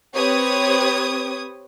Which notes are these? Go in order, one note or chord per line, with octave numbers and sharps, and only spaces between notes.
C4 G4 B4 C#5 D#6 G#6